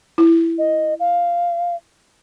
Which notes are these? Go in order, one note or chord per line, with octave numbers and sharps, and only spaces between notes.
E4
D#5
F5